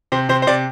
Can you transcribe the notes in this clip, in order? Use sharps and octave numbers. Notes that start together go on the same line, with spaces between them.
C3 C5
C3 C5
C5
C3 D5